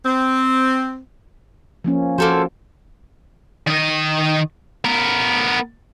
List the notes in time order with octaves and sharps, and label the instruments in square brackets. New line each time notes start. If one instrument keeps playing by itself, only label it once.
[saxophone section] C4
[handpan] F3 A#3 C#4
[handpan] F3 F#4 [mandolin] A#3 A4 C5
[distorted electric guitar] D#3 D#5
B3 A#4